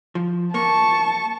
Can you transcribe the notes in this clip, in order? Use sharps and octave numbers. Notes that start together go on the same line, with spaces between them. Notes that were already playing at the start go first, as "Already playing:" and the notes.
F3
A#3 A5 C#6